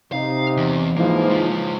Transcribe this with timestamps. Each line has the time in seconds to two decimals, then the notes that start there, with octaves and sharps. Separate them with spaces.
0.12 C3 D#4 F5
0.57 E2
0.97 G#2 E3 F3 A#3
1.29 G#3 F4